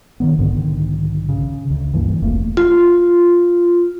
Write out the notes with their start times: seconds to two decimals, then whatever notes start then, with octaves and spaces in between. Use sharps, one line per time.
0.20 D#3 F#3 B3
0.38 B1 G#2 D3 D#3
1.29 C#3
1.70 D2
1.93 C#2 G2 E3 A#3
2.22 F1 A3 A#3
2.57 F4